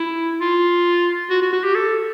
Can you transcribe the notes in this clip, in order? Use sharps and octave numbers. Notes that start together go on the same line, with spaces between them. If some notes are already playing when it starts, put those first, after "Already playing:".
Already playing: E4
F4
F#4
F#4
F#4
G4
A4